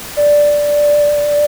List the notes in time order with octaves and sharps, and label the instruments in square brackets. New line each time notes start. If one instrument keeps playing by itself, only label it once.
[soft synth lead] D5